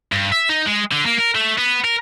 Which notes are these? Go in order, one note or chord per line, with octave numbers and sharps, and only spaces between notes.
G2
E5
D#4
G#3
D3
A#3
A#4
A3
B3
A#4